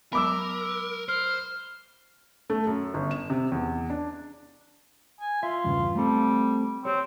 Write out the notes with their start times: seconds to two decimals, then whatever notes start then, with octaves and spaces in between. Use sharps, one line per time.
0.13 F#3 G#3 B3 A#4 B5 D6 E6
1.08 C5 F6
2.50 A3
2.67 F#2
2.94 G1
3.11 E7
3.30 C3
3.52 E2
3.90 D4
5.21 G#5
5.43 F4 E5
5.64 E2 G2 C#3
5.96 G3 A3 C4 A4
6.85 C4 G4 C#5